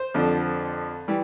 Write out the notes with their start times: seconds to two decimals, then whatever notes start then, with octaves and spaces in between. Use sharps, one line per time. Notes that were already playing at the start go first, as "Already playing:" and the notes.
Already playing: C5
0.14 F2 D3 F3
1.08 E3 G3